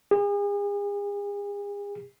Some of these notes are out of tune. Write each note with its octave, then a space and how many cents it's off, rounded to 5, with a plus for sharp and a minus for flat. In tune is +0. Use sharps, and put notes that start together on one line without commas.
G#4 -40